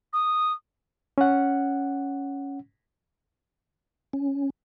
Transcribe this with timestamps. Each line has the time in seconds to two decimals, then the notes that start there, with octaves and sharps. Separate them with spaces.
0.13 D#6
1.18 C#4 F#5
4.13 C#4